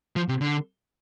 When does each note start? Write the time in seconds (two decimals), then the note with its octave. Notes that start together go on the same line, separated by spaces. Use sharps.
0.16 F3
0.28 C3
0.41 D3